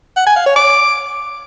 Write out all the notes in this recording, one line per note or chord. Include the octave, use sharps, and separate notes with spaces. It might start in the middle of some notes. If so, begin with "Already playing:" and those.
F#5
G#5
F5
C#5
D6